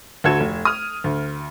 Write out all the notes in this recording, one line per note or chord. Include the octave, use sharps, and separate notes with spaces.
D2 F#4 A4 G#6 E7
F1
D#6 F6
D2